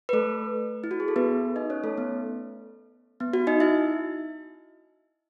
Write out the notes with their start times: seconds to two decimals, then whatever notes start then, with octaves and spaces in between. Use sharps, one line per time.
0.09 B4
0.13 A3 A4
0.84 E4
0.91 F#4
1.00 G#4
1.08 A4
1.16 B3 B4
1.56 D#4 D#5
1.70 C#4 C#5
1.84 A3 A4
1.98 B3
3.20 B3
3.34 F#4
3.47 D#4 D#5
3.60 E4 E5